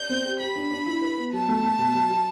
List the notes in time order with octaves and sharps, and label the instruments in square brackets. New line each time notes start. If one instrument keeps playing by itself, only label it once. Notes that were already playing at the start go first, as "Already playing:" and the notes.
Already playing: [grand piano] D5 [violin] G6
[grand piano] C4
G4
[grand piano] G4 [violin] B5
[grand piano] D4
D4
E4
B4
B3
[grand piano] F#3 [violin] A5
[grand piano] A3
A3
B2
F#3
F#3